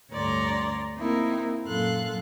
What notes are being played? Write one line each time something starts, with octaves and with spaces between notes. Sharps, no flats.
D2 G2 C#5 D5 A#5 C6
A#3 C4 D#4 E4 A#4
F#2 A#2 A4 F5 C6 F#6